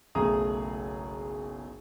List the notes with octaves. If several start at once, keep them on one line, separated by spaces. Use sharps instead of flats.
F#1 B1 A3 G#4 A#5 D#6